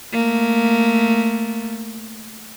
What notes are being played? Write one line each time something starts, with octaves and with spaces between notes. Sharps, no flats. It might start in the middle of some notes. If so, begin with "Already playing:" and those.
A3 A#3